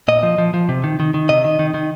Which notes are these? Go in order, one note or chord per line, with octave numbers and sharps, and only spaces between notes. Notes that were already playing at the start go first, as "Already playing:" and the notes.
A#2 D#5
F3
F3
F3
C3
D#3
D#3
D#3
C3 D#5
D#3
D#3
D#3